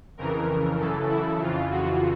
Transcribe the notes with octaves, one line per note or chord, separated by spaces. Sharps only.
F2 C#3 E3 A#4
F#2 C#3 E3 A4
E4
F2 C#3 E3 F4
F#4